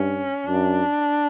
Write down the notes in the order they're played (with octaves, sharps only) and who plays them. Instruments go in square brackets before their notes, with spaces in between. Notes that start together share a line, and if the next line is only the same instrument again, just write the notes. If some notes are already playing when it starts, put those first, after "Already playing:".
Already playing: [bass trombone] G2 [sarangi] C#4
[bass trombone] F#2 [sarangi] D4